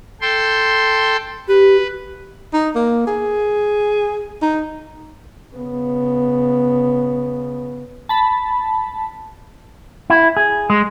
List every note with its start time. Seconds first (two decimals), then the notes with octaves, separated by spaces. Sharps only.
0.21 A4 G5 C6
1.48 G4 B4
2.54 D#4
2.75 A#3
3.07 G#4
4.42 D#4
5.54 C#3 B3
8.09 A5 B5
10.10 E4
10.37 G#4
10.70 G#3